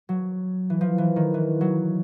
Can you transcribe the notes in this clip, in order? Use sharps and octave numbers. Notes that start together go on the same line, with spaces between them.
F#3
E3
F3
E3
D#3
E3
F#3